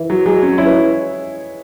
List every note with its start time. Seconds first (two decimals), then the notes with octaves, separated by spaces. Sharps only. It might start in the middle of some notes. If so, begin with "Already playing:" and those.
Already playing: E3 E4
0.10 F#3
0.25 F#3 G#3 G#4
0.43 C#4
0.58 E4 C#5
0.65 B4